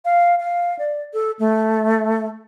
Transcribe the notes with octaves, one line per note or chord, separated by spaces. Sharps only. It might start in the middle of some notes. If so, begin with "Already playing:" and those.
F5
F5
D5
A4
A3